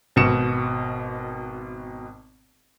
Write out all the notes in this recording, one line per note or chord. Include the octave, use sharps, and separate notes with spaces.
G#1 B2 C#7 E7